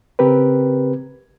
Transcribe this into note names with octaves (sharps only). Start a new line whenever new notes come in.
C#3 C4 G4 A#4 B4